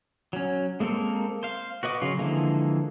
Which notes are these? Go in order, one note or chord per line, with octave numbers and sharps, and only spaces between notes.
F#3 C#4
G#3 A#3 C4 A4 A#4
C5 F5
F#4 B4 D#5 C#6 D6
C#3 F#3 F4
D3 E3 F3 G#3 A#3